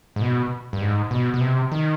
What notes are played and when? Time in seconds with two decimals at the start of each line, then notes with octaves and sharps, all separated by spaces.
0.16 G#2
0.22 B2
0.73 G2
0.81 G#2
1.11 B2
1.34 B2
1.41 C3
1.72 D#3